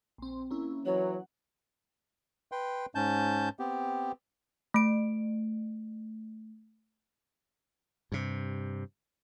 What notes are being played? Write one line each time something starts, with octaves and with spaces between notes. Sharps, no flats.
A#1 C4
A#3 C#4 E4
E3 F#3 C#5 F#5
B4 G5 C6
G#2 C#4 A5 G6
B3 C4 G4
A3 D7
G2 C3